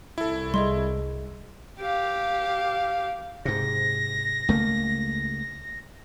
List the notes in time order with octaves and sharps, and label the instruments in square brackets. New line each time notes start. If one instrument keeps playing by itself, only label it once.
[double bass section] C2 [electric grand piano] E4 A4
[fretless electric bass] G3 [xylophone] G#4 D#5 C6
[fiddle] G4 F5
[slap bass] G#2 C3 [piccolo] A#6
[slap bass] C#2 A3 A#3